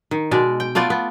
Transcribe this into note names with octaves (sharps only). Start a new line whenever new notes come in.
D#3
B2 G#3 D5
G5
A3 B3 F4 D5
B3